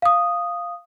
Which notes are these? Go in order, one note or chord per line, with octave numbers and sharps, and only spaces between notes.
F5 D#6